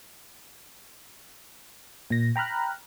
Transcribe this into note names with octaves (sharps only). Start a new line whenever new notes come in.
A#2 A#6
G5 A#5 B5 F6 F#6